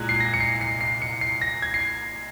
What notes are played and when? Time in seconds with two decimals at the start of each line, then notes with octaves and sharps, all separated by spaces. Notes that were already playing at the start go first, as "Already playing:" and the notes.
Already playing: C2 A#2 G#3 F#6 G#6
0.09 C7
0.20 A#6
0.34 C#7
0.40 C7
0.61 C7
0.81 C7
1.02 C#7
1.21 C7
1.41 A#6
1.62 G#6
1.74 C7